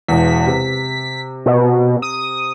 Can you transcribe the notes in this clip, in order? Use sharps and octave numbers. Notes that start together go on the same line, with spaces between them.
E1 E2 B6
C3
B2
D#6